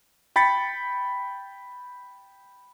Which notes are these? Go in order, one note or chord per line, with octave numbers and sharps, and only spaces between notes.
G5 B5 A6 B6 C#7